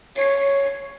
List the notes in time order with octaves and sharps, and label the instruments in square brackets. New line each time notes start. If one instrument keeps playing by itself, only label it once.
[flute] C#5 [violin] C7